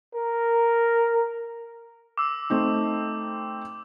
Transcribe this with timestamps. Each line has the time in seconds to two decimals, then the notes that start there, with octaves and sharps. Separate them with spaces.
0.15 A#4
2.18 D6 E6
2.50 A3 C4 D#4